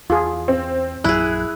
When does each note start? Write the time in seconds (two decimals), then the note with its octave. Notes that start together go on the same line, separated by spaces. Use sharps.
0.10 E2 F4 G#4
0.48 C4
1.04 A#1 F#2 F#3 E4 G#4 F#6